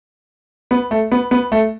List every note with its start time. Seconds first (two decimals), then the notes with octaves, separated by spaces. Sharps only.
0.71 B3
0.91 A3
1.12 B3
1.31 B3
1.52 A3